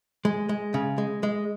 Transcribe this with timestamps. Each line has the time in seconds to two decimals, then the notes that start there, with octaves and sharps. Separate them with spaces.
0.25 G#3
0.49 G#3
0.74 C#3
0.98 G#3
1.23 G#3